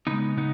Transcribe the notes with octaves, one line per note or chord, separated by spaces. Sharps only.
C#3 G#3 B3 D#4
C#3 B3 D#4